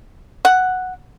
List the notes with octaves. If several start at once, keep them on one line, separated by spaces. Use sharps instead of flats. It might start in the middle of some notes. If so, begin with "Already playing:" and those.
F#5